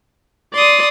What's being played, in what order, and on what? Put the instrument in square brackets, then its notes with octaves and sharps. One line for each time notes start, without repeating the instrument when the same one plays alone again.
[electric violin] D5 [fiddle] C6 D#6